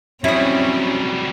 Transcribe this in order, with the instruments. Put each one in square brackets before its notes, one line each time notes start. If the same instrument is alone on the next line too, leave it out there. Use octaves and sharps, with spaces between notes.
[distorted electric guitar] F#3 G3 [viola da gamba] C4 [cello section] C#4 [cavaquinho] E4 D#6